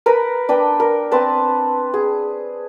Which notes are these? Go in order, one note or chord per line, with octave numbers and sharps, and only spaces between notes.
A#4 B4 A#5 B5
D4 B4 G5
A#4
C4 B4 A5
G#4